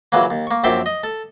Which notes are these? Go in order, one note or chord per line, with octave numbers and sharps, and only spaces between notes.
A#2 C#3 E3 F#3 A#3
D#2
A#3 C#6
A#1 F#2 C4 E5 C6 D6
D#5
A4